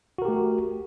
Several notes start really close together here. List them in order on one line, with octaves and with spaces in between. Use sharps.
F#4 A#4 G4 A3